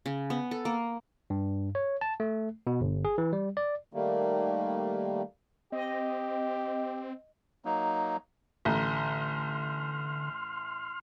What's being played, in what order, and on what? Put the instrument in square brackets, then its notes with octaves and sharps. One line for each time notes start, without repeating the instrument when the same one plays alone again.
[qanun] C#3
B3
A4
A#3
[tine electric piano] G2
C#5
A5
A3
B2
G1
G#4
E3
G3
D5
[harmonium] D#3 G3 A3 A#3
[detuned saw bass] C4 [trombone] G4 [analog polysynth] D#5
[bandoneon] F#3 A#3 D#4
[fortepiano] A1 [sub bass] D3 [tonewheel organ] C6 F6